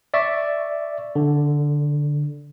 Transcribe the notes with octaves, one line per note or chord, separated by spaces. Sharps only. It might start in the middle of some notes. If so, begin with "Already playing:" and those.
D5 E5 C#6
D3